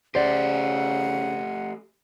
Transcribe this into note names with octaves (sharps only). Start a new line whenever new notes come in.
C#3 A3 G4 C5 D5 F#5